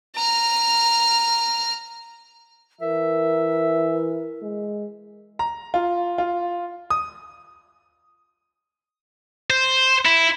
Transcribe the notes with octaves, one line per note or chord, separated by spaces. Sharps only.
A#5 F6
E3 A#4 E5
G#3
A#5
F4
F4
D#6
C5
E4